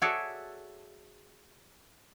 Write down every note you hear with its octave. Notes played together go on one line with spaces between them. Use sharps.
F#4 G#4 A4 C#5 D5 E5